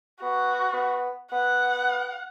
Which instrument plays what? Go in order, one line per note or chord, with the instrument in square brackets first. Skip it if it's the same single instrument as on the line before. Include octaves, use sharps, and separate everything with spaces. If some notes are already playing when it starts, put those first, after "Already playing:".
[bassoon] B3 [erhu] F#4
[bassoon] B3
[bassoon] B3 [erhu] F#5